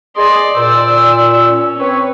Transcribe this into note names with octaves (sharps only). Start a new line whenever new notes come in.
G#4 D5 D#5 C6
A#2 C5 D5 E6
C#4
C4 B4 C#5